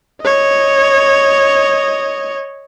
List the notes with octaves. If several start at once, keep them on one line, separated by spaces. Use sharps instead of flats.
C#5 D#5